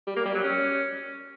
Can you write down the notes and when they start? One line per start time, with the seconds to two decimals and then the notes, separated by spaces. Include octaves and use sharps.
0.07 G3
0.16 A#3
0.26 G3
0.35 F#3
0.44 C#4